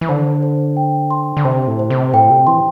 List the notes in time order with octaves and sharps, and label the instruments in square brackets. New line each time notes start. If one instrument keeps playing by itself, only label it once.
[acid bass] E3
[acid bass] D3 [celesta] C5
[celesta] C5
G5
C6
[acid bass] D3
[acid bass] C3 [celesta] C5
[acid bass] A2
[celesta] C5
[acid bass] C3
[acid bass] A2 [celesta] G5
[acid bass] C3
[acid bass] E3 [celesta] C6